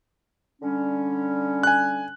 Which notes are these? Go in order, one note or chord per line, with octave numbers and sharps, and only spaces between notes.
D3 G3 C#4
G#5 F#6